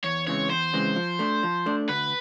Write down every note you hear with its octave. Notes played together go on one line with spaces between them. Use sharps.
E2 C#5
C#3 E3 G#3 C4 C#5
E2 C5
C#3 E3 G#3 C4
F3
A3 D4
F3
A3 D4
D2 B4